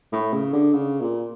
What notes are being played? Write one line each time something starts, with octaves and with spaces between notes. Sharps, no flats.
A2
C#3
D3
C#3
A#2